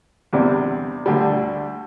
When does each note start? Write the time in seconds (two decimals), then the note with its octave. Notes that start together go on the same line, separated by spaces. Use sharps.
0.33 E2 C3 G3 D4
1.06 D2 D3 G3